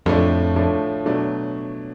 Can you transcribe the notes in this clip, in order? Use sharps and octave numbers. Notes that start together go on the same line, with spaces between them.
F2 A2 F3 A3 D4
A2 F3 A3 D4
B2 F#3 A3 D4 F#4